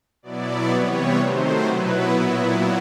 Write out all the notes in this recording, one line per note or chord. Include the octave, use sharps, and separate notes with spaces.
B2 F#3 B3 E4 D5
C3 E3 G3 B3 C#5
C3 D#3 F#3 A3 C5
B2 F#3 B3 E4 B4
A#2 F#3 B3 E4